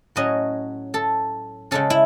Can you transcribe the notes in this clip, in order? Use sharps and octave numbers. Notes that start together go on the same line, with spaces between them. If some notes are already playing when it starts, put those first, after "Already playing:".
A2 F#3 C#4 D#5
A4
C#3 G#3 C#4 A4
E4